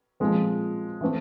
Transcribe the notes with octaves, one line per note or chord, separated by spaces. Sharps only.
A#2 F3 G#3 C4
E3 A3 C4